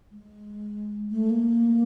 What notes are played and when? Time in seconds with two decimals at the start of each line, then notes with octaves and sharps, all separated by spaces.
0.11 G#3
1.10 A3
1.30 A#3